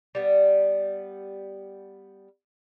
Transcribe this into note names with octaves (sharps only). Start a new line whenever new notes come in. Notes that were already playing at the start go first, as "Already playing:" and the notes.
G3 B3